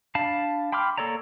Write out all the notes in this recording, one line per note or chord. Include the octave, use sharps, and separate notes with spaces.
D4 F5 A5 B5
G5 B5 C6 D6 F6
A#3 A4 C#5 D5 A#5